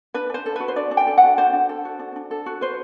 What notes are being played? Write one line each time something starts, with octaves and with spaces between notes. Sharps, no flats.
D4 B4
D4 C5
A4
F#4 B4
C5
D4 D5
D4
G5
A4
F#5
F#4
D4 C5
D4
A4
F#4
D4
D4
A4
F#4
B4 C5